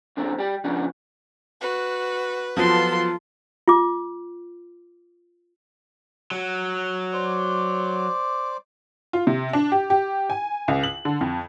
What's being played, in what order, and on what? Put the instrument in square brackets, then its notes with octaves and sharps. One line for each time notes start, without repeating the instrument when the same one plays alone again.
[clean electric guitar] F#2 D3 C4
G3 G4
C#3 F3 B3 C#4 D4
[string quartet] F#4 [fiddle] B4
[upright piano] F3 F#3 B3 [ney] F4 [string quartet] A4 C6
[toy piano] F4 D6
[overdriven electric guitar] F#3
[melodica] C5 D5 D6
[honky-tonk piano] F4
C3
D4
G4
G4
G#5
C#2
F#7
D3
F2